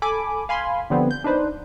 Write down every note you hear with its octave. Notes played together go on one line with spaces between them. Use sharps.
A4 G#5 B5 D6
F5 G#5 B5 C6
D3 F3 G3 B3 C4
G6
D4 D#4 B4 C5